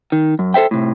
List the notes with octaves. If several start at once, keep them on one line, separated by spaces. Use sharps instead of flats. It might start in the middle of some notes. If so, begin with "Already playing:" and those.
D#3
F#2
A4 C5 E5 G5
A2 C3